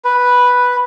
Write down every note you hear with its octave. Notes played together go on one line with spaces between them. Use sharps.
B4